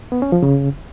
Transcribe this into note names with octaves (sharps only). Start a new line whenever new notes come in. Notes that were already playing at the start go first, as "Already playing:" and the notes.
B3
C#4
F3
C#3